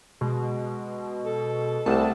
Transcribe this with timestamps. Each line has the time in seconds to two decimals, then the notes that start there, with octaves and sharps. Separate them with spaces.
0.21 B2 G#3
1.25 A4
1.86 C2 A3 C4 F#5 A5